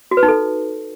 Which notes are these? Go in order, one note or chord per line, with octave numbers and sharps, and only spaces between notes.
F#4
B4
D#4
A4